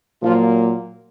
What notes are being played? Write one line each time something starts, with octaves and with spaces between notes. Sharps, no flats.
A#2 F3 F#3 A#3 F4